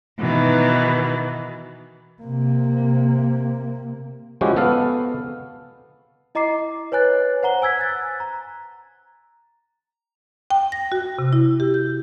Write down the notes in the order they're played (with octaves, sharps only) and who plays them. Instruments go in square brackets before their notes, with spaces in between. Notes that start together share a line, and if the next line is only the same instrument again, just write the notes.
[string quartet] B2 D#3 E3
[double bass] C3 A#3
[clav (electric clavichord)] F3 G#3 C#4 E4 F#4 G4
B3 A4 F5
[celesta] E4 D#5 A#5 D6 C7
B4 C#5 G#5 F#6 A6
C5 F#5 A#5 G7
G#5 E6 G#6 B6
F#6 A6
A#5
[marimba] G5
A#6
F#4
C3
E4
G4
G6